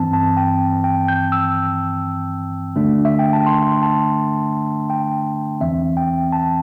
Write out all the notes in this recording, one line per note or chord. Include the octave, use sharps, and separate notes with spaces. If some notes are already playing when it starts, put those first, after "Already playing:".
Already playing: G2 E3 C4 A5
A5
G5
G5
G6
E6
D3 A3 D4
E5
G5
A5
C6
A5
G5
E2 E3 C4 E5
G5
A5